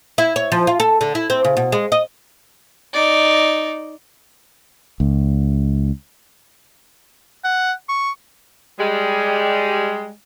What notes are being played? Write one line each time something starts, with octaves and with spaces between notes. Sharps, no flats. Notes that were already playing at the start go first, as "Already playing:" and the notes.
E4
C#5
F3
F4
A4
D3
E4
C4
C#3
B2
G#3
D#5
D#4 D5
C#2
F#5
C#6
G3 G#3